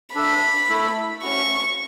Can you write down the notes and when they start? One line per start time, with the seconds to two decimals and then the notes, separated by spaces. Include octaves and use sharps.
0.15 D4 A4 E5 B5
0.70 A3 E4 A4
1.22 A3 C#4 F#4 C#6